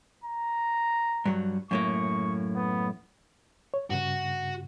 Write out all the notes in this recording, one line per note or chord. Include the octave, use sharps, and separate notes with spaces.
A#5
G2 F#3
F#2 A2 A#3 C#6
B3
C#5
G2 C#3 F#4